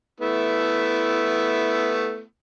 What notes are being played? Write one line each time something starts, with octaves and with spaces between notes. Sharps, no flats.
A3 B3 E4